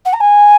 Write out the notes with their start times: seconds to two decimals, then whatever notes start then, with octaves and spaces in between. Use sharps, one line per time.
0.05 F#5
0.13 A#5
0.20 G#5